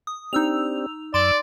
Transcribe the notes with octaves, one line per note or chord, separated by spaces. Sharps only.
D#6
C4 D4 D#4 G4 E6 F7
F#2 D5 C6 E6 D7